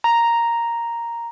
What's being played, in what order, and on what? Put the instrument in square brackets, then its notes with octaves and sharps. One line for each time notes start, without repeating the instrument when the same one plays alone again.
[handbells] A#5